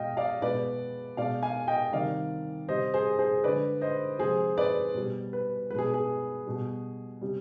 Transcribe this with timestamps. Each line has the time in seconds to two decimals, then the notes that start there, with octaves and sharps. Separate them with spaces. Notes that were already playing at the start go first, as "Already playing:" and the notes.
Already playing: B2 G#3 D#5 F5 G5
0.17 D5 F5
0.42 B2 G#3 B4 D5
1.17 B2 G#3 D5 F5
1.43 F5 G#5
1.68 D#5 G5
1.93 C3 D#3 G3 D5 F5
2.68 C3 G3 C5 D#5
2.94 G#4 C5
3.19 G#4 C5
3.44 D3 G#3 B4 D5
3.81 C5 D#5
4.19 C3 F3 G#3 G#4 C5
4.58 B4 D5
4.94 B2 G3
5.33 B4
5.70 G#3 B4
5.75 B2 G#4
5.94 G#4
6.46 B2 G3
7.21 C3 G3